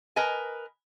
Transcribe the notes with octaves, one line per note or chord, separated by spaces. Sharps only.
A#4 B4 D#5 G#5